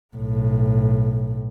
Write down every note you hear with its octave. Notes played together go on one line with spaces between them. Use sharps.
B1 A2